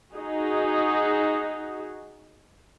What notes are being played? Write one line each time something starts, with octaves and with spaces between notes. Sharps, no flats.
D#4 F#4 G#4